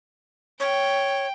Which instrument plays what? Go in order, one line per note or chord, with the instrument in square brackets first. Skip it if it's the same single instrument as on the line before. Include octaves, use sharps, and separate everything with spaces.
[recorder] C#5 [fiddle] G5